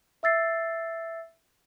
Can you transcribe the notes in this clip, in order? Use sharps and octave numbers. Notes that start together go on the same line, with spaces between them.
E5 E6 A6 C7